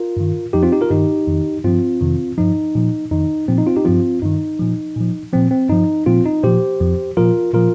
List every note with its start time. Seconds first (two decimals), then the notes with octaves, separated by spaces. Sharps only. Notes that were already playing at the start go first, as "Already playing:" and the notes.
Already playing: F4 A#4
0.17 G2 D#3
0.53 F2 F3 D#4 G4
0.63 C4 F4
0.72 D#4 G4
0.81 F4 A#4
0.90 G2 D#3 D#4 G4
1.27 F2 D#3
1.65 G2 F3 C4 F4
2.01 F2 C3 D#3
2.38 G2 F3 D#4
2.75 A#2 F3
3.11 F2 D#3 D#4
3.48 A#2 F3 C4
3.58 D#4
3.66 C4 F4
3.76 D#4 G4
3.85 G2 F3 C4 F4
4.22 G2 D#3 D#4
4.59 A#2 F3
4.96 A#2 F3
5.33 A#2 F3 C4
5.51 C4
5.69 G2 F3 D#4
6.06 A#2 F3 C4 F4
6.26 D#4
6.43 A#2 F3 G4 C5
6.81 F2 F3
7.17 A#2 F3 F4 A#4
7.54 A#2 F3 F4 A#4